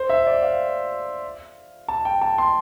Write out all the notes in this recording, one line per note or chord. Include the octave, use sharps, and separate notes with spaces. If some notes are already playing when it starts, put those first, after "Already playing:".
Already playing: C5
E5
D5
F5
A5
G5
A5
C6